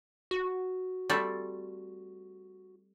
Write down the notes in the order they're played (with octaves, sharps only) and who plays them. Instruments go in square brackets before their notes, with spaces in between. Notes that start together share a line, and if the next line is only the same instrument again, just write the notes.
[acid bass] F#4
[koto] G3 A3 C4